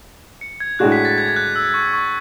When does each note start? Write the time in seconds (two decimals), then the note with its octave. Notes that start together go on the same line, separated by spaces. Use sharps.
0.41 C#7
0.60 G#6
0.79 A2 G#3 D4 F#4 F#6
0.92 B6
1.05 A6
1.18 G#6
1.29 G#6
1.36 F#6
1.56 E6
1.74 C#6
1.93 C#6